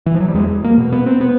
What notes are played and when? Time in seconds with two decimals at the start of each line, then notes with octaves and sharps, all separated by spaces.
0.06 E3
0.14 F3
0.21 F#3
0.28 G3
0.34 E2 G#3
0.64 A#3
0.78 B2
0.92 B3
1.06 C4
1.21 B3